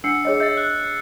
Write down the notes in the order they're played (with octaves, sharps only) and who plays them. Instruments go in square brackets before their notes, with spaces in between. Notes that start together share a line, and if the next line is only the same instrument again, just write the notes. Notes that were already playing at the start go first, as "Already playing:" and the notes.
[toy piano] D4 F#5 [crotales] E6 C7 C#7
[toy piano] G#4 C#5 D#5
[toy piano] D#5 E5 [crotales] G6 A6
[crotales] F#6